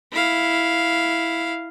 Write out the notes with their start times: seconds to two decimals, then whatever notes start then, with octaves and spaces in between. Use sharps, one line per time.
0.12 E4 F5